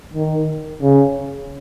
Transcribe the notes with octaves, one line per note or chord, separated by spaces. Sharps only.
D#3
C#3